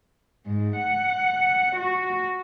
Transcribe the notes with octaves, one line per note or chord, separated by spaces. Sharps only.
G#2
F#5
F#4